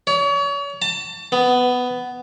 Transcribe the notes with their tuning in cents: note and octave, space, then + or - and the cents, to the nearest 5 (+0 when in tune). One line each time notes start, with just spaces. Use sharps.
C#5 +35
A5 +30
B3 +10